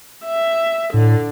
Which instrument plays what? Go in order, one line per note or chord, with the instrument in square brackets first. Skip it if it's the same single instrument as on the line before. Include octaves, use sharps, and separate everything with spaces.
[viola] E5
[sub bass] A2 [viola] D3